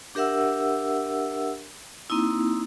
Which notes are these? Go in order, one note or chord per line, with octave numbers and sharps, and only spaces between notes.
D4 G4 A#4 E5 F#5 E6
A#3 C4 D#4 E4